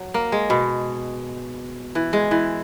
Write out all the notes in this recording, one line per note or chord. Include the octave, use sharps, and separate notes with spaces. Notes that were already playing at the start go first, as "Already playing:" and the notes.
Already playing: F#3
A#3
G#3
B2
E3
G#3
E3